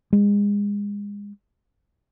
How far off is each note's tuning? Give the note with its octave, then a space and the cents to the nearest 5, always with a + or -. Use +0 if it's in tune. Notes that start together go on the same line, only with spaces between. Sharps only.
G#3 -30